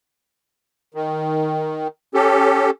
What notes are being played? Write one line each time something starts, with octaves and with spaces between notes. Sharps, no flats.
D#3
C#4 G4 A4